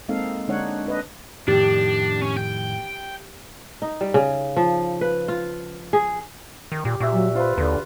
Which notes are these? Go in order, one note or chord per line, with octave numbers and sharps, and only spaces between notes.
G#3 A#3 C4 D#4 A4 F5
D3 G#3 D4 D#4 C#5 F#5
D4 B4 D#5
F2 A2 D#3 D4 G4
C#4
G5
D#4
G3
C#3
F3
B4
F4
G#4
D#3
A#2 G4
A#2 F#4 E5
F#3
F4 B4 C5
D#2 D3 B4